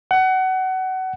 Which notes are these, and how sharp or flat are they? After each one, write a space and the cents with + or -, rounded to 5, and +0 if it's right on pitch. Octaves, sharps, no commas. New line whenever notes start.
F#5 +25